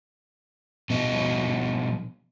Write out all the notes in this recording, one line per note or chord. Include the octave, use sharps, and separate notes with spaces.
B2 F3 B3 D#5